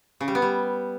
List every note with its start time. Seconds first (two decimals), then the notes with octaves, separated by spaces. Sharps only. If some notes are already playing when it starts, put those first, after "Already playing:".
0.20 C#3
0.28 G3
0.35 B3
0.42 G3